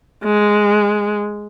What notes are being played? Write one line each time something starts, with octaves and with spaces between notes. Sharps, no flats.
G#3